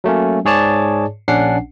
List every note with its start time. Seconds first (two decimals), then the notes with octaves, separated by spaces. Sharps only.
0.04 F#3 A3 A#3 C#4
0.45 G#2 G#4 C#5 D5 A5
1.28 A#1 C#4 D4 F#5 C7